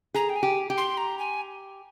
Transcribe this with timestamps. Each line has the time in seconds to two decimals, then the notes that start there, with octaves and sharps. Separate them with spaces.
0.14 G#4 A#5
0.29 G5
0.36 G#5
0.43 G4
0.70 G4
0.77 C6
0.97 A#5
1.19 G#5